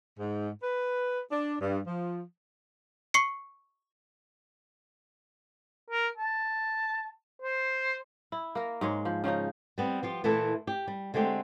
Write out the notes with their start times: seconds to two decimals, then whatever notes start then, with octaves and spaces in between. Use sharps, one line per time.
0.18 G#2
0.62 B4
1.31 D4
1.60 G2
1.86 F3
3.14 C#6 C7 C#7
5.90 A#4
6.18 A5
7.42 C5
8.32 E4
8.55 A#3 A#4
8.81 G#2 G#3 C#5
9.05 F3
9.24 C#3 F3 C#4 D#4
9.78 G3 B3 C4
10.03 F3 F4 G4
10.24 A#2 E3 A3 E4 A4
10.67 G4
10.88 G3
11.14 D3 G#3 A3 C4 G4